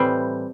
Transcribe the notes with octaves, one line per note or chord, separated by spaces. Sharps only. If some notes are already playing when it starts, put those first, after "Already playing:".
Already playing: A2 E3 G3 C4